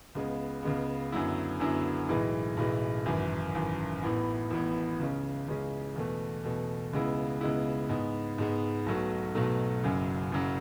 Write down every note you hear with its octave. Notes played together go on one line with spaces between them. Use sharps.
C#2 C#3 G#3 B3
C#2 C#3 G#3 B3
F#2 D3 F#3 B3 E4
F#2 D3 F#3 B3 E4
B1 A2 E3 G#3
B1 A2 E3 G#3
G#1 F#2 E3
G#1 F#2 E3
A1 A2 E3 B3
A1 A2 E3 B3
C#2 C#3 G#3 C#4
C#2 C#3 G#3 C#4
E2 B2 A3
E2 B2 A3
C#2 C#3 G#3 B3 E4
C#2 C#3 G#3 B3 E4
G#2 G#3 B3
G#2 G#3 B3
B1 B2 F#3 A3
B1 B2 F#3 A3
F#1 F#2 C#3 F#3
F#1 F#2 C#3 F#3